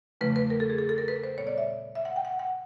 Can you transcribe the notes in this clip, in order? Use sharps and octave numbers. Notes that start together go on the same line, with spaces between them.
E2 C#3 F3 A3 B4
B4
A#4
A4
G#4
A4
A4
A#4
B4
C5
A#2 G3 B3 C#5
D5
E5
E5
F#5
G5
F#5
F#5